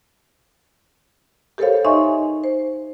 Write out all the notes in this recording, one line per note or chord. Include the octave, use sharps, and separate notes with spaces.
G4 A4 A#4 C5 C#5 F5
D#4 D#5 E5 G#5 C6 C#6
C5